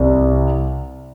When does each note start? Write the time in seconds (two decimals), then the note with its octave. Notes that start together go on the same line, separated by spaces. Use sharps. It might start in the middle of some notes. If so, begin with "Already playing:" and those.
Already playing: C2 C3